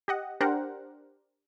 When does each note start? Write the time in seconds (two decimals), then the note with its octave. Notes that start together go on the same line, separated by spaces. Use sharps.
0.08 G4 D#5 F#5
0.40 D4 G4 A#4 C5 F#5